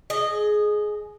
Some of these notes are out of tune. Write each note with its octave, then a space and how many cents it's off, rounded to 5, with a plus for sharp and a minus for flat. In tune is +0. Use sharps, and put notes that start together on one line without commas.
G#4 +15 D#5 -15